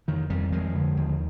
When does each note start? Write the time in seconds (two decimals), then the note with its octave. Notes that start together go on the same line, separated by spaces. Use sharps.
0.08 F2 D#3
0.30 F2 D#3 G3
0.52 F2 F3 G#3
0.75 D3
0.97 D#2